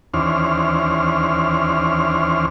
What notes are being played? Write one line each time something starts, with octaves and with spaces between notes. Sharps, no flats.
D#2 E3 C#4 D4 C5 F6